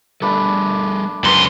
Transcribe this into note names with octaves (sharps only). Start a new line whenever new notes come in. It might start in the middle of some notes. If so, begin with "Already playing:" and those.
G3 A3 D4 A4 B4
C#2 F#2 B3 C6